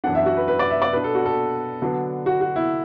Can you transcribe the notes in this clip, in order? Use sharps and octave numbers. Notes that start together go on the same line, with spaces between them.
F#2 E3 B3 D4 F#5
E5
F#4
B4
B4
D5
E5
D5
B2 B3 D4 B4
A4
F#4
A4
D3 F#3 B3 D4
F#4
F#4
E4